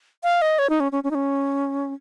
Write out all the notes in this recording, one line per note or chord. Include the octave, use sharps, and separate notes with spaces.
F5
D#5
C#5
D#4
C#4
C#4
C#4
D#4
C#4